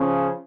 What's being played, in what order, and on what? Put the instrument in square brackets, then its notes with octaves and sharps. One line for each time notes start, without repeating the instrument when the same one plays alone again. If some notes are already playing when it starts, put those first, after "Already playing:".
Already playing: [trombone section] C#3 F3 C#4